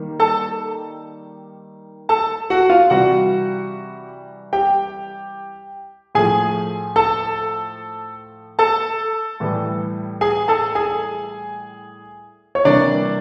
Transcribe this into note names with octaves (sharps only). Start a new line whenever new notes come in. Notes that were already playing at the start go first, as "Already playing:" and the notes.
Already playing: D#3 G3 A#3
A4 A5
A4 A5
F#4 F#5
F4 F5
C3 E3 G3 F#4 F#5
G4 G5
A2 F3 A3 G#4 G#5
A4 A5
A4 A5
A2 E3 G3
G#4 G#5
A4 A5
G#4 G#5
C#5
C3 E3 G3 A#3 D4 D5